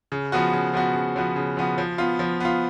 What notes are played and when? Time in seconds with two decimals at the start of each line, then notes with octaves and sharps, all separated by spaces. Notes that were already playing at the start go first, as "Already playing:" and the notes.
0.12 C#3
0.32 F3 B3 F#4
0.53 C#3
0.74 F3 B3 F#4
0.94 C#3
1.16 F3 B3 F#4
1.36 C#3
1.57 F3 B3 F#4
1.78 F3
1.98 B3 F4
2.19 F3
2.40 B3 F4